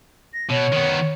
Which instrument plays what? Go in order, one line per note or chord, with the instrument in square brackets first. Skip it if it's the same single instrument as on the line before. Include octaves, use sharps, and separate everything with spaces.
[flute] A#6
[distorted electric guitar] B2 [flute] C#5
[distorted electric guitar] D#3 B3